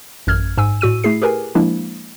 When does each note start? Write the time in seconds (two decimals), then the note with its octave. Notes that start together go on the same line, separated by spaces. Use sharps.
0.27 A1 F#2 F6 G#6
0.57 G#2 G#5 E6
0.81 A2 F#4 E6 D#7
1.04 A3 E4 G#4 C7
1.22 G4 G#4 A#4 B4 G#5
1.55 F3 G#3 A#3 D4 E4